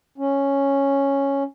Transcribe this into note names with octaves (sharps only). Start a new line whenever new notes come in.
C#4